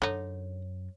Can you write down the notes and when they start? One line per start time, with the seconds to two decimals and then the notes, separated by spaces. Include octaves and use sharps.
0.02 F#2 D3 D#4 C#5